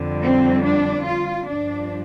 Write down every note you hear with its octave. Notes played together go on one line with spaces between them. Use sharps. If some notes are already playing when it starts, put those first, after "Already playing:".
Already playing: F2 D3 G3
C4
D4
F4
G2 F3 D4